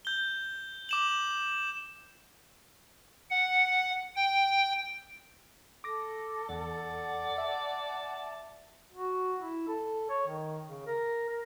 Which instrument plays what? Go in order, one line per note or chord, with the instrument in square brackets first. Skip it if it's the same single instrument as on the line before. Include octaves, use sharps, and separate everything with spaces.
[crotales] G6 G7
D6 E7 F#7
[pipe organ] F#5
G5
[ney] A4 [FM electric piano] D6 A#6
[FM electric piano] E2 [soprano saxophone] D5 [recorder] F#5
[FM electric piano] E5 [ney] A5
[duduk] F#4
E4
A4
C#5
D#3
C#3
A#4
A#4